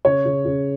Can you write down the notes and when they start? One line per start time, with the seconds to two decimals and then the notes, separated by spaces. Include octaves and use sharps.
0.05 C#3 C#5
0.25 C#3
0.45 C#3